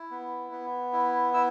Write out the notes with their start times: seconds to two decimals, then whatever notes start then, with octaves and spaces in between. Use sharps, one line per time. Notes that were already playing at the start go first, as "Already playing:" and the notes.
Already playing: E4
0.11 B3
0.52 B3
0.93 E4
1.34 E4 E6